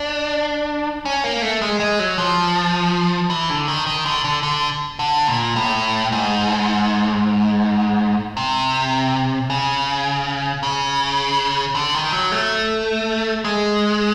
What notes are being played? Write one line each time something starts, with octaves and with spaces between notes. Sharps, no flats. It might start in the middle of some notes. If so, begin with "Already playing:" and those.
Already playing: D4
C#4
A#3
A3
G#3
G#3
F#3
F3
E3
D3
D#3
D#3
D3
D3
D3
D3
A#2
A2
G#2
C3
C#3
C#3
D3
D#3
F#3
A3
G#3